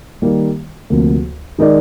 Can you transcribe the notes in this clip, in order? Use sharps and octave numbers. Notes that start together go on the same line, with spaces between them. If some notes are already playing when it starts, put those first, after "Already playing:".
D#3 G3 A#3
D2 C3 F3 A#3
D#3 G#3 D#4 A#4 D5